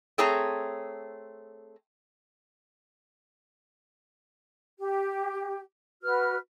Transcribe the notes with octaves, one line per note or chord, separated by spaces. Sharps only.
A3 C4 G#4 C#5 A5 A#5
G4
F#4 B4 F6